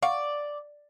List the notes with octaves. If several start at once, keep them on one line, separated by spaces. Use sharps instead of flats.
D5 F5 F#5 C#6